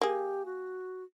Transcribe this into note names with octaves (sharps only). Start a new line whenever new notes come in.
A#3 G4 G#4
F#4